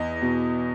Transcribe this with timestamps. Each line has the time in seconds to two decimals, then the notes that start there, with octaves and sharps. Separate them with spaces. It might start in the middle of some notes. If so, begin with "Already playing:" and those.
Already playing: E2 D#5
0.22 B2